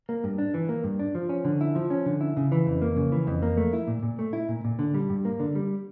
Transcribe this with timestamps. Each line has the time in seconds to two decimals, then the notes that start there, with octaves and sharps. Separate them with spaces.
0.09 A#3
0.24 G2
0.38 D4
0.54 E3
0.69 A#3
0.84 G2
0.99 D4
1.15 F3
1.29 C#4
1.45 D3
1.61 E4
1.75 F3
1.90 C#4
2.06 D3
2.21 E4
2.37 C#3
2.52 E3
2.66 F2
2.82 A#3
2.96 C#3
3.12 E3
3.27 F2
3.42 A#3
3.57 A3
3.73 E4
3.87 A#2
4.03 A#2
4.19 A3
4.33 E4
4.49 A#2
4.65 A#2
4.79 D3
4.94 G3
5.09 G2
5.25 A#3
5.40 D3
5.55 G3